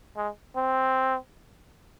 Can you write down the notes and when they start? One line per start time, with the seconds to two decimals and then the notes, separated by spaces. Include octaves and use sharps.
0.17 G#3
0.56 C4